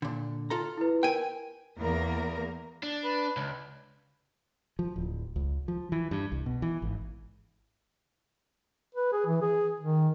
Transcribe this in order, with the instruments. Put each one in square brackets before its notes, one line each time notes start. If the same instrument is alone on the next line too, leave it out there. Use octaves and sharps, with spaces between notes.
[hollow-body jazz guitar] A#2 D3
F4 A4 A#5
[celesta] E4 B4
[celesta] A#4 [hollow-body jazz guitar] G5 G#5
[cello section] E2 A#3 A#4
[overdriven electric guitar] D4
[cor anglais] B4
[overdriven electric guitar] C#2
[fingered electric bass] F3
D1
C#2
F3
E3
G2
C2
B2
E3
G#1
[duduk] B4
G#4
E3
G#4
D#3